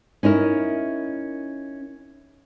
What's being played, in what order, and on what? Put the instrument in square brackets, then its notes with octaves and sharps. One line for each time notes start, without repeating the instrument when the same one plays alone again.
[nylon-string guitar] C#4 D#4 E4 A#4